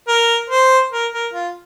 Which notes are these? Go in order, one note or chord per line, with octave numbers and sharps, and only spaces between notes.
A#4
C5
A#4
A#4
F4